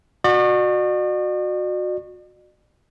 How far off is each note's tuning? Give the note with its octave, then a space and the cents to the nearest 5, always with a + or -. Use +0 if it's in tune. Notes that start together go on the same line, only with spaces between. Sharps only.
F#4 -20 D5 +45